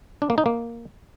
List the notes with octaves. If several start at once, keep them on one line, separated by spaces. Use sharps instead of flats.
D4
A#3
D#4
A#3